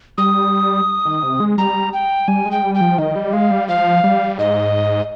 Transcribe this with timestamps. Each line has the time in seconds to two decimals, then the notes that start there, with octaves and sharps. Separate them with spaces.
0.18 G3 D#6
1.05 D#3
1.23 C3
1.40 G#3
1.58 G3 A#5
1.93 G5
2.28 G3 G#5
2.46 G#3
2.51 G5
2.63 G3
2.74 G5
2.81 F3
2.98 D#3 D#5
3.15 G3
3.33 G#3 F5
3.51 G3
3.68 F3 F5
4.04 G3
4.38 G#2 D#5